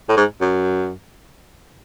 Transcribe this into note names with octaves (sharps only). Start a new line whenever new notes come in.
A2
G#2
F#2